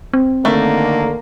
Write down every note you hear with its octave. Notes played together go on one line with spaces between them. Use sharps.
C4
D3 D#3 A3 A#3